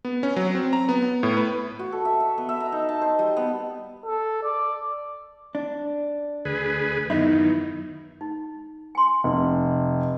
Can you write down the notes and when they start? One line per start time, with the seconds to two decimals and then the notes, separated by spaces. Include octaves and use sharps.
0.05 B3
0.23 C#4
0.36 F#3
0.55 C4
0.73 A#5
0.89 B3
1.02 B3
1.23 A2
1.37 B4
1.79 F#4
1.92 A4
2.05 E5
2.20 E5
2.38 B3
2.49 E5
2.60 A#5
2.72 D#4
2.89 A5
3.01 C5
3.19 G3
3.36 B3
4.06 A4
4.43 D5
5.55 D4
6.45 D2 G#4 B4
7.10 F#2 D#3 B3 D#4 E4
8.21 D#4
8.95 G#5 C6
9.24 F1